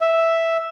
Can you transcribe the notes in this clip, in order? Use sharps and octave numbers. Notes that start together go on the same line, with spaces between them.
E5